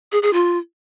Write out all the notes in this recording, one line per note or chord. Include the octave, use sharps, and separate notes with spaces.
G#4
G#4
F4